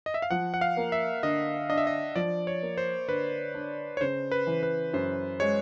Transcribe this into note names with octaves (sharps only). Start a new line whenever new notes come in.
D#5
E5
F5
F3 F#5
F#5
F5
A#3
E5
D3 D#5
D4 D#5
E5
D#5
F3 D5
C#5
A#3
C5
D3 B4
D4
C#5
C#3 C5
B4
E3
B4
F#2 C5
G#3 C#5